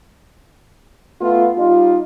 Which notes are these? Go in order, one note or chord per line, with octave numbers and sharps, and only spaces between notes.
A3 B3 F4
G3 D#4 F4